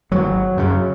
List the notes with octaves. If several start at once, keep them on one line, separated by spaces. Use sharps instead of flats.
G#1 F#3
F#2 C#3